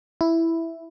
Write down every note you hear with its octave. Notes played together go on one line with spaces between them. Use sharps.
E4